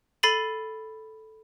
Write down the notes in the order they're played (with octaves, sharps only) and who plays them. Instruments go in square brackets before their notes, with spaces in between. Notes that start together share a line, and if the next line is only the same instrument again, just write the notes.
[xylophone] A4 B5 A6 C7 D#7 F#7